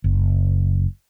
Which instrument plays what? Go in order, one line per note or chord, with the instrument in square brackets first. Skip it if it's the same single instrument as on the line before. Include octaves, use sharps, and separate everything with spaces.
[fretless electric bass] F#1